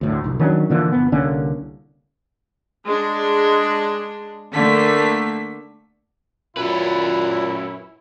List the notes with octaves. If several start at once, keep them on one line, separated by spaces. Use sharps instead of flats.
D2 A2 D3
F1 C2
D#3 F#3 C#4 D4
A#2 D3 E3 F3
G1 B3
C2 D3 A#3 C#4
G#3 D4
D3 A3 A#3 B6
F#2 A#2 C#4 E4 B4